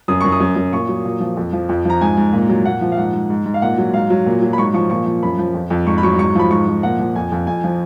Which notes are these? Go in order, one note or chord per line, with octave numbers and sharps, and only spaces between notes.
F#2 D#6
F#2 C#6
D#6
F#2
F#2
A#2 C#6
F#3
A#2
F3
F2
F3
F2
F3 A#5
G#2 G#5
G#2
A#2
F#3
A#2 F#5
F3
F5
G#2 F#5
G#2
G#2
G#2
F5
A#2 F#5
F#3
G#2 F5
F#3
A#2
F#3
B5
G#2 C#6
F3 C#6
A#2 C#6
F3
F#2 B5
F3
F2
F2
G#2 C#6
B5
F#3 C#6
G#2 C#6
F3 B5
G#2 C#6
F3
A#2 F#5
F3
F2 G#5
F2
F2 G#5
F3